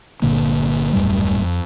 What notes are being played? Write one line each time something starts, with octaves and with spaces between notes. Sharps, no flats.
G1 A#2 D3 A#3
D#1 F#2 A2 G3
F2